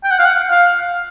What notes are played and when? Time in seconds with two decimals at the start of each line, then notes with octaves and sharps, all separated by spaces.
0.04 G5
0.11 F#5
0.19 F5
0.25 F#5
0.51 F5